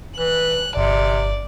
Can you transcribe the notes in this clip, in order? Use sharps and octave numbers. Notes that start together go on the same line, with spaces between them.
E3 F#6
G1 C3 D5